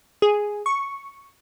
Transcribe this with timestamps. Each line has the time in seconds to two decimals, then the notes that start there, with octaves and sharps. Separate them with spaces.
0.22 G#4
0.66 C#6